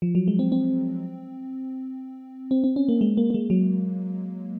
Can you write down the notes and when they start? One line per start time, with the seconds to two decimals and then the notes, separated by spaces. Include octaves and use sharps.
0.02 F3
0.15 F#3
0.28 G#3
0.39 C4
0.52 C4
2.51 C4
2.64 C4
2.76 C#4
2.88 A#3
3.01 G#3
3.17 A#3
3.30 A#3
3.34 G#3
3.50 F#3